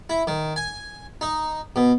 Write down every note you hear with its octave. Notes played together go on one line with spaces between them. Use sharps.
E4
D#3
G#5
D#4
B2